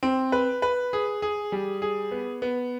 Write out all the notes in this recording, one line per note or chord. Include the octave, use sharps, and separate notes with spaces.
C4
B4
B4
G#4
G#4
G3
G#4
B3
B3